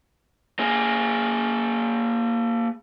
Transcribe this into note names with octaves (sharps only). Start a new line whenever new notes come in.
A#3 G#4